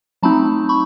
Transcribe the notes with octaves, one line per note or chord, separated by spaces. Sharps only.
F#3 A3 C4 D#4 A5 B5
B5 C#6